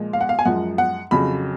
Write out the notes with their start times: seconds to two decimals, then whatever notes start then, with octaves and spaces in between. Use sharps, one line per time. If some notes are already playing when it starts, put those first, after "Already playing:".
Already playing: A#2 F3 G#3
0.13 F5
0.21 F#5
0.29 F5
0.39 G#5
0.45 F#2 F3 G#3 F#5
0.78 F#5
1.11 F2 C#3 F#3 B5